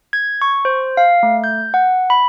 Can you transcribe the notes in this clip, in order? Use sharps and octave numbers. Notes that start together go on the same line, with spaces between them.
G#6
C#6
C5
F5
A3
G6
F#5
B5